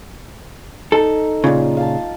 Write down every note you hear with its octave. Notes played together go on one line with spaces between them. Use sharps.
D#4 A4
A#2 C#3 F4
F5 A5